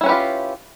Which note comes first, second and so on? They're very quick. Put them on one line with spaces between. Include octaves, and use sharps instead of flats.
E4 C#4 B4 G4 F4